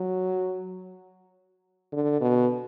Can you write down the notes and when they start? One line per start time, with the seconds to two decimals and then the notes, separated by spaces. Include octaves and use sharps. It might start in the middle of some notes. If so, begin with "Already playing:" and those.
Already playing: F#3
1.93 D3
2.21 B2